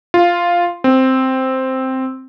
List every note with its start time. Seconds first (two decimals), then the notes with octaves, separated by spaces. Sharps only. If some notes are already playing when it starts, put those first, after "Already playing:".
0.14 F4
0.84 C4